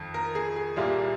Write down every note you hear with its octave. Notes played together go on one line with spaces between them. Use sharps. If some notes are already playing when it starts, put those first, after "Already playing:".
Already playing: F2 D#3
A#4
G#4
G#4
C2 A#2 G3 A#3